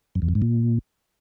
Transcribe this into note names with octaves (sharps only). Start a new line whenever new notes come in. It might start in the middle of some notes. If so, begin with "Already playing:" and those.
F#2
E2
F2
G#2
A#2